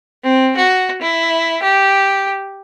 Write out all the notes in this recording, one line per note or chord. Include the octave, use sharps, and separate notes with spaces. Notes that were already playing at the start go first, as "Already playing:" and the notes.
C4
F#4
E4
G4